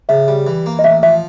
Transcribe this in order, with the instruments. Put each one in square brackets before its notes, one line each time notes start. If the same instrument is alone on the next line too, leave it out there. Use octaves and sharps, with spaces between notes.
[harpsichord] C#3 [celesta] E5
[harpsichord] G3
E3
A#3
[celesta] D#5
[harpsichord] A1 [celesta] E5
[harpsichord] F3 [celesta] E5